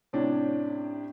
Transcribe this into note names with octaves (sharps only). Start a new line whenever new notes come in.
A2 C3 C#4 D4